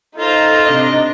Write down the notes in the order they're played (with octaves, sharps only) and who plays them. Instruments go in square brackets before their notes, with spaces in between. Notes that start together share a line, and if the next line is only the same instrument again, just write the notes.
[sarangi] D#4 [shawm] F4 [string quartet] A4 C5 A#5
[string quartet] C3 D4 [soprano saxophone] D#5